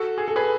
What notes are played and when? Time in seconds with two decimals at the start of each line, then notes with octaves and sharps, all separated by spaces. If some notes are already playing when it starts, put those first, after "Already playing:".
Already playing: F#4 A4
0.18 G#4
0.28 A4
0.36 G#4 B4